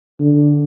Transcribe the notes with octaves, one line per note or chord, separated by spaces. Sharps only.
D3